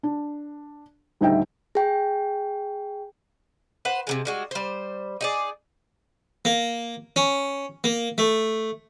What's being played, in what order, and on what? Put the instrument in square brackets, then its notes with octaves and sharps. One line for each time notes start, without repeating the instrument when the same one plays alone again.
[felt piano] D4
D#1 D2 D#4 E5 G5
[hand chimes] G#4 G5
[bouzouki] B4 C5 F#5
C3 E3 G#3
G3 G#3 F#4
G3 C5
D#4 G#4 D5
[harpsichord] A#3
C#4
A#3
A3